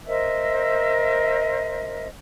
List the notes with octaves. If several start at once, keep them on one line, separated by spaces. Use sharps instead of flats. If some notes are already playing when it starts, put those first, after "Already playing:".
A#4 C5 D#5 E5